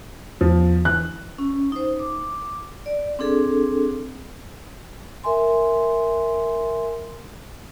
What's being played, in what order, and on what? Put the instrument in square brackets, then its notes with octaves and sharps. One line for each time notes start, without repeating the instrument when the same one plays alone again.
[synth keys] E2 [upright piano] F3
[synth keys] E3 [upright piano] F#6
[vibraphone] C#4
D#4 C5
D6
D5
C4 D4 G#4 A4
A#4 E5 G#5 C6